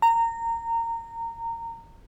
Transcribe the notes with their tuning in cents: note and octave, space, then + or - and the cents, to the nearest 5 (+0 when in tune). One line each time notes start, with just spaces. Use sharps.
A#5 -20